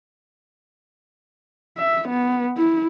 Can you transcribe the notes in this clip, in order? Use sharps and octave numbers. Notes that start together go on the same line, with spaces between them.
E5
B3
E4